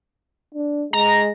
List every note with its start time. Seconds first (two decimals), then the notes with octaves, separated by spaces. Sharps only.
0.55 D4
0.93 G#3 A#5